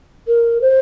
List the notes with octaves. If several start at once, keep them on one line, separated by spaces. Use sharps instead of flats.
A#4
C5